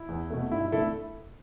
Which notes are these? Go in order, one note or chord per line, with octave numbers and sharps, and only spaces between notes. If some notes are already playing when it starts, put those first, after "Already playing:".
Already playing: E4
E2
B2 A3
G2 E4
E4
D3 A3 E4 A4